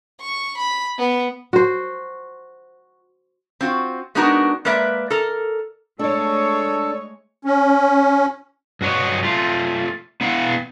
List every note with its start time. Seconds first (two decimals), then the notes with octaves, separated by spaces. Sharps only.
0.21 C#6
0.58 B5
0.99 B3
1.53 F#4 C5
3.61 C4 F4 F#4
4.15 G#3 B3 D4 D#4 F#4 A#4
4.65 G#3 A#3 A#4 B4 D5 E5
5.11 A4 A#4
5.99 G#3 A3 D4 A4 C#5 D5
7.45 C#4
8.81 G2 F#4 C#5 D#5
9.23 A3 F4
10.21 B3 E4 F5 F#5